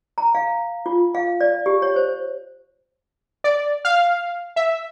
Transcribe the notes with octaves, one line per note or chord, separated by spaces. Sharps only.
A#5
F5
F4
F5
D5
G4
C#5
C5
D5
F5
E5